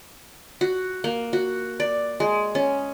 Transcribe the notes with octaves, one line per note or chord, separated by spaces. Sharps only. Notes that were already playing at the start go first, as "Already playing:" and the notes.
F#4
A#3
F#4
D5
G#3
C#4